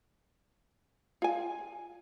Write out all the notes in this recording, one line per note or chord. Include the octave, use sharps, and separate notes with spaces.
F4 G#5